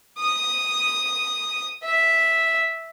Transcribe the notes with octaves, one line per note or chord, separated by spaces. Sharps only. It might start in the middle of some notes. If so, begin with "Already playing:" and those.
D#6
E5